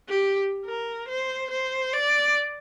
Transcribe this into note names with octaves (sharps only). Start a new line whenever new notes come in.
G4
A#4
C5
C5
D5